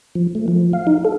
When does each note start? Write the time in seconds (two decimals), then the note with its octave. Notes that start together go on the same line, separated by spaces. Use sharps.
0.15 F3
0.35 A3
0.48 F3
0.73 F5
0.87 D#4
1.05 A4